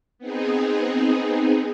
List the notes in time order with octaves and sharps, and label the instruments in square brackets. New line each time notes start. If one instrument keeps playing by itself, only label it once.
[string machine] B3 C4 D#4 G#4